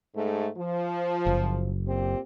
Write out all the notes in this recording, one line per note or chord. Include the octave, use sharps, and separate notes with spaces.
G#2 A3
F3
F#1
A#2 C4 G4